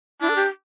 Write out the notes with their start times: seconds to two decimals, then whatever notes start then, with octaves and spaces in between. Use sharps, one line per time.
0.21 D4 E4
0.29 A4
0.36 G4